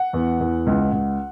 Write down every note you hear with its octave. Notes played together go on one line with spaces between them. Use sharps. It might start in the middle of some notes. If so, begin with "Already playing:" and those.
Already playing: F#5
E2
E2
C#2
C#2